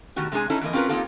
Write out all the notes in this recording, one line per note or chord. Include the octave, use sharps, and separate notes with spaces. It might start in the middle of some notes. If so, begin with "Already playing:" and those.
B2 D#3 A3 F#4 G4
C3 G#3 D4 G#4 G#5
C#4 D#4 E4 A4
F2 E3 A#3 D#5
C4 C#4 F4 G#4 A#4 B4
A#3 C4 D#4 F4 G4 A4